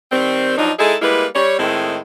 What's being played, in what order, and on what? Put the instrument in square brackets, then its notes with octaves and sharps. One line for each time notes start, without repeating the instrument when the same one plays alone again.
[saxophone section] D#3 G3 C4
F3 F#3 D4 D#4
G#3 D#4 E4 G#4 A4
G3 G#3 A#3 E4 B4
G3 C#5
A2 D#3 G#3 C4 E4